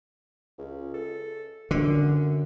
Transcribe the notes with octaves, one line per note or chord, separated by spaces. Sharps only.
C#2
A4
F#2 D3